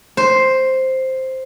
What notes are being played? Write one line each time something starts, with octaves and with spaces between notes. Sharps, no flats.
C5